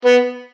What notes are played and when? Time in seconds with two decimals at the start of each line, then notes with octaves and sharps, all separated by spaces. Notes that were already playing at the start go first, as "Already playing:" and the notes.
0.05 B3